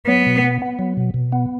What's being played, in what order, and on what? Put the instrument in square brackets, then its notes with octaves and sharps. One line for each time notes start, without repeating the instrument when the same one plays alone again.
[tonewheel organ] F#3 [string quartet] B3
[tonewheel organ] B2
B3
B3
F#3
B2
B2
B3